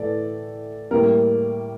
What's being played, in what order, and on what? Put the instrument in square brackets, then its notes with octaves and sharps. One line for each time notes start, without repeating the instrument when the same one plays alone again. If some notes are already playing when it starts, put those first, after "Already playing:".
Already playing: [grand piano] A2 E3 A3 D5
A2 G3 A#3 A#4